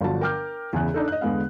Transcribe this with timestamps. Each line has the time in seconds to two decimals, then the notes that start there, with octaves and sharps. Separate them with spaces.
0.01 G1 D3 F3 F#3 D5 A5
0.21 A#4 G5 D6 F6 G6
0.73 E2 C#3 E3 F#6
0.94 D4 D#4 A4
1.08 D#5 F#6
1.21 E2 D3 G#3 B3 F5